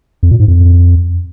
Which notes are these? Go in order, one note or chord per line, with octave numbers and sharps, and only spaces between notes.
F2
A#2
G#2
F2